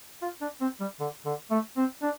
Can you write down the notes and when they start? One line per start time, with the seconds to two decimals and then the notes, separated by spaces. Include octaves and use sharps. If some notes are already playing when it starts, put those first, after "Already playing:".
0.22 F4
0.41 D4
0.61 C4
0.80 G3
1.00 D3
1.26 D3
1.51 A3
1.77 C4
2.02 D4